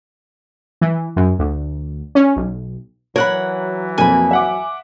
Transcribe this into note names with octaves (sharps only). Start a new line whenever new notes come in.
E3
F#2
D2
C#4
B1
E3 F#3 A#4 C#5 F#5 B5
F2 A#3 G#5 B5
E5 F#5 D6